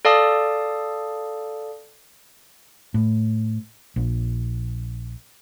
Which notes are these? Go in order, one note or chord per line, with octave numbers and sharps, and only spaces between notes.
A4 D5 F5 A5 D#6
A2
A#1